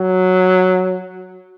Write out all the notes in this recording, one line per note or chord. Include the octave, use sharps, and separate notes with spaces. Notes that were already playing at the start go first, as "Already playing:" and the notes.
Already playing: F#3